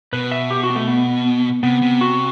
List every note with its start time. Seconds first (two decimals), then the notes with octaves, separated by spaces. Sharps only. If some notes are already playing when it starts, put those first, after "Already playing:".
0.13 B2 B4
0.31 E5
0.51 G4
0.63 F#4
0.70 B3
0.76 A3
0.88 B3
1.63 C3 B3
1.82 C3
2.01 F#4